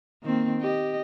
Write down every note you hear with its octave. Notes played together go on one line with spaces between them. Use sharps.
D#3 A#3 C4
G4 D#5